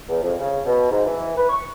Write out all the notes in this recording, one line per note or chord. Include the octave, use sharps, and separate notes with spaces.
E2
F2
C#3
B2
G#2
E3
B4
C#6